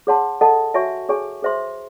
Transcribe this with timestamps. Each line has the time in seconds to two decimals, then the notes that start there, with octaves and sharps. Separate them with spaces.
0.07 G#4 C#5 F#5 A5 C6
0.41 A4 D#5 F#5 A5
0.74 F#4 C#5 E5 G#5 C#6
1.09 G#4 C#5 G#5 C#6
1.42 G#4 C5 E5 C6